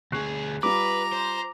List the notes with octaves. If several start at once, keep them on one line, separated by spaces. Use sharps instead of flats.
D2 G#4 C#6 F#6 C7
G3 F4 B4 A#5 D6
C5